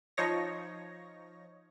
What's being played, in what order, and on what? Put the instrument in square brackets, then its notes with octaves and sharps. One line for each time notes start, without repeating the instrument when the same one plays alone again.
[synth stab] F3 D#4 C#5 A#6